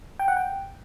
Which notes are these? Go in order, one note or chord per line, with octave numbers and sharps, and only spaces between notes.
G5
F#5
G5